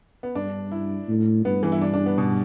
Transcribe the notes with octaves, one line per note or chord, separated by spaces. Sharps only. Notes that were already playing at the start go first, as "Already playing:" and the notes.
B3
G2 D4
E4
A2
G2 B3
E3
E4
D4
D4
B3
B2